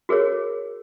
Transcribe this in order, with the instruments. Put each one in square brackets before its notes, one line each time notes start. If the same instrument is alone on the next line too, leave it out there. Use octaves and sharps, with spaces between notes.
[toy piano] F#4 G#4 A#4 C#5